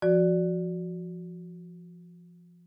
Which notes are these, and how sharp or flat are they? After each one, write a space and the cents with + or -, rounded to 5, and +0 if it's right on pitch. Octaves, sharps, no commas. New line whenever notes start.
F3 -15 F#4 +0 D5 +0